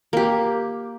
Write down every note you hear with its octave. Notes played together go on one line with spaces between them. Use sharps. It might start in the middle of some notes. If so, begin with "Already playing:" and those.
A#3 G4